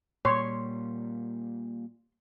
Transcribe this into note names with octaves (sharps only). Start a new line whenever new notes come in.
A#2 G3 C#5 C6